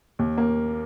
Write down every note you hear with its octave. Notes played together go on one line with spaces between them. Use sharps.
D#2
A#3